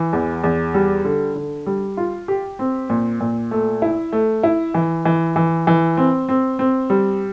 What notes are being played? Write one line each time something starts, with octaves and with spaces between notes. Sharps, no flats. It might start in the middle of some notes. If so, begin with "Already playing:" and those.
Already playing: E3
E2
E2
G3
D3
D3
G3
F4
G4
C4
A#2
A#2
A3
E4
A3
E4
E3
E3
E3
E3
C4
C4
C4
G3